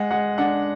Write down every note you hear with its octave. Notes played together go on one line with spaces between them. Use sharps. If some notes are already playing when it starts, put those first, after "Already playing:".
Already playing: G#3 F#5
G#3 F#5
D4 F#5